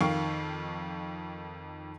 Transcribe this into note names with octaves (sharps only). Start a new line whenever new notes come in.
F2 D#3 F5 G5 C#6